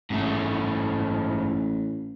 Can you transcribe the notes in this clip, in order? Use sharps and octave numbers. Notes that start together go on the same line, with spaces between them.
A1 G#2 A3